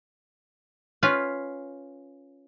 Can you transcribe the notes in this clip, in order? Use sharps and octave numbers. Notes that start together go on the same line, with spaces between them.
C#4 F4 B4